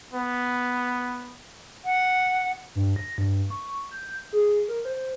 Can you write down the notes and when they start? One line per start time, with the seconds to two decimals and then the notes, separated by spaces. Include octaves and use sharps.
0.14 B3
1.85 F#5
2.75 G2
2.96 A#6
3.18 G2
3.50 C#6
3.91 G6
4.33 G#4
4.68 A#4
4.85 C5